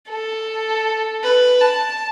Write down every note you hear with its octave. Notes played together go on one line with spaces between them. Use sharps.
A4
B4
A5